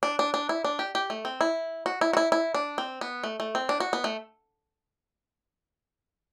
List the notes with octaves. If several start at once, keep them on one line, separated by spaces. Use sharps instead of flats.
D4
D4
D4
E4
D4
G4
G4
A3
C4
E4
F#4
E4
F#4
E4
E4
D4
C4
B3
A3
A3
C4
D4
F#4
B3
A3